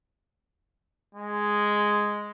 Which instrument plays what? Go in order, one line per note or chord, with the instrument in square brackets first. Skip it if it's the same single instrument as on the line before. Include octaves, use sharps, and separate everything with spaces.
[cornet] G#3